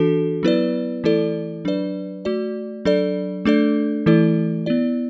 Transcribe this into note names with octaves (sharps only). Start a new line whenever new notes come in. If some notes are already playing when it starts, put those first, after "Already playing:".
Already playing: E3 D4 F#4 A4
F#3 B3 E4 B4 D5
E3 A3 E4 A4 D5
F#3 D4 B4 D5
A3 F#4 D5
F#3 D4 A4 D5
A3 D4 A4 D5
E3 A3 E4 A4 D5
B3 E4 D5